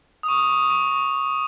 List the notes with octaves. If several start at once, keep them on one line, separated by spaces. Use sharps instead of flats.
D#6
C#6
C#6
C#6